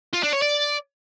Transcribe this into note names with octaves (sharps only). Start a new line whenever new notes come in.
F4
D4
C#5
D5